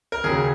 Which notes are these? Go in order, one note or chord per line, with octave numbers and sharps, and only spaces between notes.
A#4
D#2 C#3 F#3 G#4